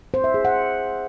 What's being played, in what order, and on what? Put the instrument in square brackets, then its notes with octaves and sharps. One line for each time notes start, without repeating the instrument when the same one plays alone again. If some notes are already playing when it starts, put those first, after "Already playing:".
[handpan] C5
E5
G#4
F#5